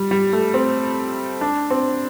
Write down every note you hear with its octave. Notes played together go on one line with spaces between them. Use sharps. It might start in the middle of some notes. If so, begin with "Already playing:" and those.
Already playing: G3
G3
A3
C4
D4
C4